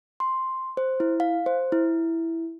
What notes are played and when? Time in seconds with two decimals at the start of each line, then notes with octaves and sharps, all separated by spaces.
0.20 C6
0.77 C5
1.00 E4
1.20 F5
1.46 C5
1.72 E4